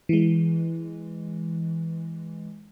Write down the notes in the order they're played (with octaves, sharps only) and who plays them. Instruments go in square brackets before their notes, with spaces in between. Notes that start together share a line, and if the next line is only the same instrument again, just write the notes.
[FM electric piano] E3 G#3